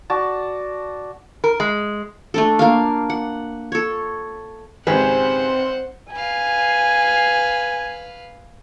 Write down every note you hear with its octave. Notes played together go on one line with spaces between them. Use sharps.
F#4 D5 A5
A#4
G#3
A3 D4 A4
A#3 D4 F5
F#5
A4 C#5
G#1 C#3 C4 G4 G#4 B4 C5 F#5
B4 F5 G#5